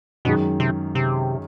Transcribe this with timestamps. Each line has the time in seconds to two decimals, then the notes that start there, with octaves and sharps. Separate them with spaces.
0.25 F#2 B2 D#3 G#3
0.60 C3
0.95 C3